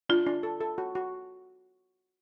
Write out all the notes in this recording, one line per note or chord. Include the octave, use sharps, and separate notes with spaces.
D4 F4
D4
A4
A4
F#4
F#4